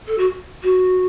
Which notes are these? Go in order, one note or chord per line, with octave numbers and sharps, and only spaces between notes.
A4
F#4
F#4